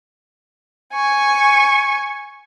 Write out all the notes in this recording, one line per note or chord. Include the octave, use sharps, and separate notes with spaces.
G#5 C#6